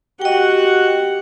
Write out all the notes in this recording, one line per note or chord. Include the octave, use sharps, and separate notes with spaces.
F#4 G4 D#5 F#5 G5